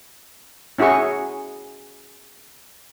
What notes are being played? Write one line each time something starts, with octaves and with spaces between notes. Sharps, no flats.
C#4 E4 F#4 G#4 C#6